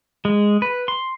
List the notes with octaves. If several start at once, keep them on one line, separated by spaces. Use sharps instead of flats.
G#3
B4
C6